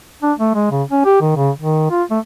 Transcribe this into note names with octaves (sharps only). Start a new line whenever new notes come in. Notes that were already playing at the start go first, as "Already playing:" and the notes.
D4
A3
G#3
C#3
C#4
G4
D#3
C#3
D#3
F4
A3